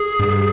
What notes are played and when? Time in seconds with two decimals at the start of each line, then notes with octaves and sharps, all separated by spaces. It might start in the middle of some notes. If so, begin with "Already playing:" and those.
Already playing: G#4
0.20 G2